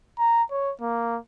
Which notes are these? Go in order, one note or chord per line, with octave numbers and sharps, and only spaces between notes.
A#5
C#5
A#3